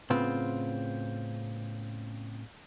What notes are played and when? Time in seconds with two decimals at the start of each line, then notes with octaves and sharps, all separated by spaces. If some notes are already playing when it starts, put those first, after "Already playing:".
0.10 A2 C#3 B3 C4 F4